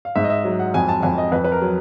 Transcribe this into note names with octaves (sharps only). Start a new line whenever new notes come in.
F5
G#2 E5
D#5
E5
F#3
F#5
F2 G#5
A5
F2 G#5
D#5
F2 B4
B4
A#4
F#3